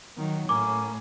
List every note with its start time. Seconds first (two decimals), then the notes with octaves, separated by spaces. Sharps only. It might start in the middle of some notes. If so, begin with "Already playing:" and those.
0.18 D#3 F#3
0.49 A2 A#3 C#4 D6